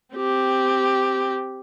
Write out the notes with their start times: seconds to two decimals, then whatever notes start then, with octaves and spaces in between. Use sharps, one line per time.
0.15 C4 G4